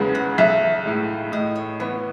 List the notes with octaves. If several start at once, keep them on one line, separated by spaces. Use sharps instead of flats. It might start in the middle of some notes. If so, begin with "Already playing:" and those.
Already playing: F#1 E2 C#3 G#3 B3
F#5
B1 E5
A2 G#3
A2 D#5
C#5
E3 B3 C#5